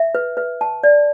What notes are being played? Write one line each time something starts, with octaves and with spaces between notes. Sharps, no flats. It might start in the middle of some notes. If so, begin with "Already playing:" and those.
Already playing: E5
B4
B4
A5
D5